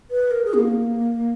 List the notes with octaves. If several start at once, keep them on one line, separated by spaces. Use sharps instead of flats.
B4
A#4
G#4
B3
A#3